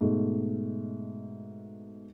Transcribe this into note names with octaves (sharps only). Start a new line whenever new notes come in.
G#2 B2 A3